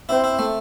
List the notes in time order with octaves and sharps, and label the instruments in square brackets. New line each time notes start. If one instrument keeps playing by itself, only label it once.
[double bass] C4 [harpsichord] E4
[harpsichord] E4
A3